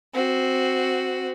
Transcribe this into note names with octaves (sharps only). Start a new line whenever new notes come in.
C4 F#4